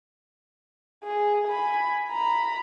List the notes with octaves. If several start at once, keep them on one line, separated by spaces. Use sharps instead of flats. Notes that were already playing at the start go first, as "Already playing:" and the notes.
G#4
G#5 B5
A#5 B5